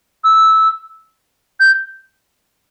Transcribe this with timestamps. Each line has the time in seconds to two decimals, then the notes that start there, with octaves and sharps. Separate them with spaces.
0.24 E6
1.60 G6